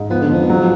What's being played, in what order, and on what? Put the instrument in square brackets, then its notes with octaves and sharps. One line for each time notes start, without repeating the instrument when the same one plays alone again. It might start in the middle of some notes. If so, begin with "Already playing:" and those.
Already playing: [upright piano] G#2
[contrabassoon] F3 [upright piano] B3
[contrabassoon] D3
[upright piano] F2 [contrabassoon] F3
[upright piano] F#3